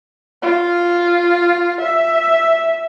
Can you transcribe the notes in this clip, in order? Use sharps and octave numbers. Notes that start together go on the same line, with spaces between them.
F4
E5